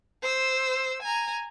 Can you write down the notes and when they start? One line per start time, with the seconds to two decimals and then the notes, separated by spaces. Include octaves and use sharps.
0.22 C5 E6
1.03 G#5 A#5